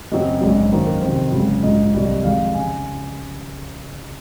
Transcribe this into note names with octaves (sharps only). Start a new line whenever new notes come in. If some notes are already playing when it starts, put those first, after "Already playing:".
F#2 C#3 F#3 C4 D#5
A#1 G#2 F#3
F#2 D#3 A#3 D#4 C5
A#4
F2 C3 D#3 C5
G#1 F#2 C#3 F#3
A#1 G#2 F3 D#5
C2 C3 F#3
F2 D#3 G#3 F5
C#3 G#5